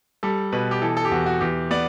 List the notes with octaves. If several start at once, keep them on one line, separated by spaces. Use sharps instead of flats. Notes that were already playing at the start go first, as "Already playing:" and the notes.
G3 A4
B2 B4
G4
E3 A4
A4
G4
E2 F#4
F#4
E2 G4
B3 D5